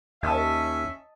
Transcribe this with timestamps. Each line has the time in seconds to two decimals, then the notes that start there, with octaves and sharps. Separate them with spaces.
0.23 D#2 C#4 D#5 E5 A5